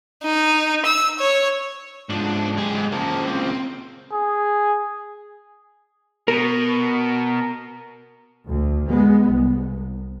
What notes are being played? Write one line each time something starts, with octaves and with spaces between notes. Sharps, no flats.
D#4
E6
C#5
G#2 F3 D4
G#3 G4 G#4
G#2
C#2 A#3 C5 A5
C4
G#4
B2 A#4
D2
G#3 B3
C2